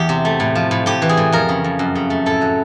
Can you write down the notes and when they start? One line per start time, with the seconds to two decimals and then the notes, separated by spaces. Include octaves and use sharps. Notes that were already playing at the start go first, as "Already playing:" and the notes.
Already playing: E2 G4
0.09 C3
0.25 A3
0.40 A2
0.55 F3
0.71 A2
0.86 A2 G4
1.02 E3
1.09 G#4
1.17 A2
1.32 F2 A#4
1.49 C#3
1.64 F2
1.79 F#2
1.95 C#3
2.10 A3
2.26 A2 A4
2.41 F#3